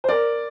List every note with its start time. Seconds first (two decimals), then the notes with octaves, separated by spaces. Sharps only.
0.04 C5
0.09 A#4 D5